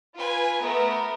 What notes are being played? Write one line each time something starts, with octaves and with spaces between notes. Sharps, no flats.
F4 B4 G#5
A3 B3 A#4